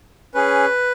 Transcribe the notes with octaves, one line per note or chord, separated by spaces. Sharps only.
C#4 G#4 B4